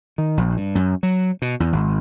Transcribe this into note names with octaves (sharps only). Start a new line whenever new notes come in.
D#3
A#1
G2
F#2
F#3
B2
E2
G#1